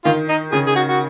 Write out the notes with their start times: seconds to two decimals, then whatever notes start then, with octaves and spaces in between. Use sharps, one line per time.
0.05 D#3 F4
0.29 D#4
0.52 C#3 G#4
0.67 G#4
0.76 F#4
0.88 F#4